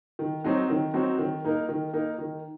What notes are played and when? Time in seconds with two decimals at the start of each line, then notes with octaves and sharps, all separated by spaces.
0.19 D#3
0.44 F#3 C4 D#4 F#4
0.70 D#3
0.94 F#3 C4 D#4 F#4
1.19 D#3
1.44 A#3 D#4 A#4
1.69 D#3
1.93 A#3 D#4 A#4
2.18 D#3